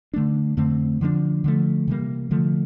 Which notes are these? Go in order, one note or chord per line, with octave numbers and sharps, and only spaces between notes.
D3 A3 D4
F2 D3 A3 C4
D3 F3 A#3 D4
D3 F3 A3
C3 E3 G3 A#3
D3 F3 A3